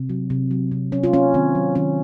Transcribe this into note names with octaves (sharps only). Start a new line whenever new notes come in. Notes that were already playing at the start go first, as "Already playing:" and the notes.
Already playing: C3
F#3
C3
F#3
C3
F#3 C#4
F4
A#3 C#4
D#3 C4
F#3
D#3 C#4